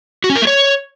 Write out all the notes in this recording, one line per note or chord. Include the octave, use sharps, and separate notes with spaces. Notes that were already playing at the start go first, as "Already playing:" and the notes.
F#4
C#4
A#4
A3
C#5